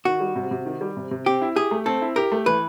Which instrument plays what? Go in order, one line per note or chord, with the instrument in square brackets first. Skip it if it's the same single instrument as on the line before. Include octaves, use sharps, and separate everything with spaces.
[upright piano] D#3 [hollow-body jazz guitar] F#4
[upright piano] G3
C3
C3
D#3
G3
C3
C3
[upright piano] C4 [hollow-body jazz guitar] G4
[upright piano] E4
[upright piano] G4 [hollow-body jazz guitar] G#4
[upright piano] A3
[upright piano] C4 [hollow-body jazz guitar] A4
[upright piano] E4
[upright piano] G4 [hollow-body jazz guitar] A#4
[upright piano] A3
[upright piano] E3 [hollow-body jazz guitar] B4